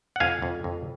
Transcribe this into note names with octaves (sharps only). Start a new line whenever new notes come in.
F#5
F2 F5 G#5
F2
F2